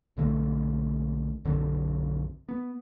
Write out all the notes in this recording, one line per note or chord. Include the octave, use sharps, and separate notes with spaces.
B1 D3 A3 C4
B1 F#2 D3 C4
B3